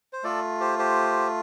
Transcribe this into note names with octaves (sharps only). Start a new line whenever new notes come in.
C5
A3 F4 A4 D5
G4 C5
G4 C5